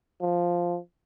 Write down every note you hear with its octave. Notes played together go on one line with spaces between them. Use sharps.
F3